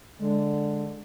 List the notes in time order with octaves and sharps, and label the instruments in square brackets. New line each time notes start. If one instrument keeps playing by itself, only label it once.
[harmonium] D3 [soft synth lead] G#3